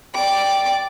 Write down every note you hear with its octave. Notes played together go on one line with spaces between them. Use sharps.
D5 G5 D6